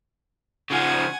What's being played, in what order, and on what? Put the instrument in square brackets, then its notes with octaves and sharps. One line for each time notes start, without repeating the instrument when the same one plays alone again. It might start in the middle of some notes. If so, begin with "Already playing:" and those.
[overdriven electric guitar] C#3 F3 [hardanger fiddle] F#5 G#5